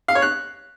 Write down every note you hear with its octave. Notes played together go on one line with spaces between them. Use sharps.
F5
C#5
F#6